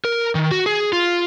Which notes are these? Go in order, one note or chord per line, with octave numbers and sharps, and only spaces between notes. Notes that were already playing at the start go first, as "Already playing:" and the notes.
A#4
D#3
F#4
G#4
F4